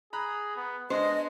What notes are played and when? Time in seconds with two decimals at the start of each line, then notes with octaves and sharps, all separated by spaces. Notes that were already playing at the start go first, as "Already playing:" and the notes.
0.13 G#4 A#5 B5 F#6
0.57 B3
0.90 G#3 B3 D4 C5 D#5